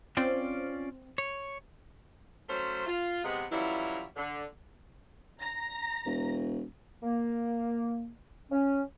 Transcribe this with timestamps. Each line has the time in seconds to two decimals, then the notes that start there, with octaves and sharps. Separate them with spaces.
0.17 C4 C#4 F4 D5
1.18 C#5
2.50 F#3 A3 C#4 C5
2.87 F4
3.24 C3 G#3 B3
3.51 E3 F#3 G3 C#4 E4 F4
4.16 D3
5.41 A#5 A#6
6.06 E1
7.03 A#3
8.51 C#4